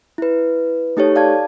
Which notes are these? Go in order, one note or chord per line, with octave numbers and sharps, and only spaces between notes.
E4 B4
A3 D#4 G4 A4 C#5
D5 F5 A5 G#6